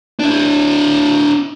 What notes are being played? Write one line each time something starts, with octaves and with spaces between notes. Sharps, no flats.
D4 E4